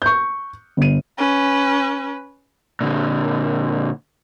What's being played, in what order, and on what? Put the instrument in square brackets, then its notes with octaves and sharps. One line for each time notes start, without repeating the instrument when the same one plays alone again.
[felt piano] C#6 G6
G1 D#7
[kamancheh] C#4 B4
[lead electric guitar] A#2 D3